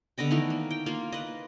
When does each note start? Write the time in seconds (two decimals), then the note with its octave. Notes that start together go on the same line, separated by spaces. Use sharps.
0.18 D3 B3 D#5 G5
0.31 D#3 E3 A3 D#4
0.50 A#3
0.71 G5
0.86 A#3 F4
1.12 B4 D#5